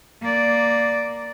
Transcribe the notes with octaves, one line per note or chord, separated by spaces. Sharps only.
A#3 D5